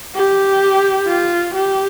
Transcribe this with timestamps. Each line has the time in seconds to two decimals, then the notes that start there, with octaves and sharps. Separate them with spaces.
0.15 G4
1.08 F4
1.55 G4